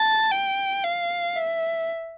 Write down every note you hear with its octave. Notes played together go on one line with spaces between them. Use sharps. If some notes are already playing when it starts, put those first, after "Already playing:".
Already playing: A5
G5
F5
E5